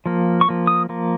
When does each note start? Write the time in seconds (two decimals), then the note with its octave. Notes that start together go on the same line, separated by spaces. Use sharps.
0.06 F3 A#3
0.41 C#6
0.48 F3 A#3
0.67 D#6
0.89 F3 A#3